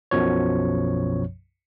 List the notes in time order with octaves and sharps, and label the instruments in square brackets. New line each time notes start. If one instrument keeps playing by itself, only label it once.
[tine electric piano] B1 F#2 B2 F3 C#5